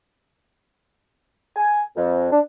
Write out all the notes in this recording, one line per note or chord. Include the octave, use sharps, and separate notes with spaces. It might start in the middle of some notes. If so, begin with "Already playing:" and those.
G#5
F2
D4